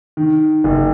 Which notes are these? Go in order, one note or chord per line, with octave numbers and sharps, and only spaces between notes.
D#3
F#1